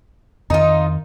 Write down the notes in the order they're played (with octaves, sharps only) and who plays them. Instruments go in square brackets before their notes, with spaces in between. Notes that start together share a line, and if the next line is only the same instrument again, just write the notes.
[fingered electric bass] F2 D#3 [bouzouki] D#4 F4